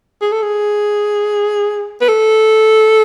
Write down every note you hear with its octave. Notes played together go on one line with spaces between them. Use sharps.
G#4
A4
G#4
B4
A4